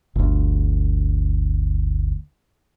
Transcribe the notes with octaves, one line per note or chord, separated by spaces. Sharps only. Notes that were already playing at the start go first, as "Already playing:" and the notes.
G1 D2